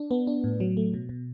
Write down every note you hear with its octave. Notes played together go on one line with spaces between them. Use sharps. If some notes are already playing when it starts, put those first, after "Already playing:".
Already playing: D4
B3
D4
A2
F#3
A3
B2
B2